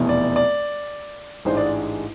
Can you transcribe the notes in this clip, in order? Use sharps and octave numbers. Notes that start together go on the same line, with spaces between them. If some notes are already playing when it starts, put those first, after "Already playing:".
Already playing: F1 E2 B2
D5
D5
A1 G#2 G#3 D4 C5
D5